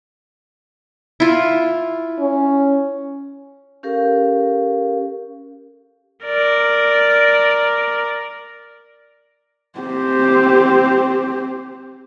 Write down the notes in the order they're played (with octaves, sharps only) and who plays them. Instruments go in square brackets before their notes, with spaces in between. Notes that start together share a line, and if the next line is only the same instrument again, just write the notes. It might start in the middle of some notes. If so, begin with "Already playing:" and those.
[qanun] E4 F4
[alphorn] C#4
[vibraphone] C#4 G4 A4 A#4 F5
[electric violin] A#4 D5
[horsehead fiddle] C4 G4